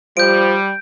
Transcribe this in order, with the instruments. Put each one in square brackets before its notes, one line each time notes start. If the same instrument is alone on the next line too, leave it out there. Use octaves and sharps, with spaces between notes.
[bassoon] F3 [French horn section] G3 [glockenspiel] G6 D7